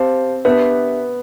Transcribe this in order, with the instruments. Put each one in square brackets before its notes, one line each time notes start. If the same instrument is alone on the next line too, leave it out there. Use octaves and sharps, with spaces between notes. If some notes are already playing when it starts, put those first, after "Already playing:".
Already playing: [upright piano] C4 [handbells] G4 C5 F5 A5
[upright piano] B3 [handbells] D4 G4 B4 E5